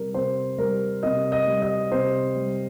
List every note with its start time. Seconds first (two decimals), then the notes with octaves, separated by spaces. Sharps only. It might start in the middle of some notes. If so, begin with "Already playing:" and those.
Already playing: C3 G3 A#4
0.14 C3 C5
0.58 G3 A#4
1.03 C3 D#5
1.32 D#5
1.47 G3
1.62 D#5
1.91 C3 C5
2.36 G3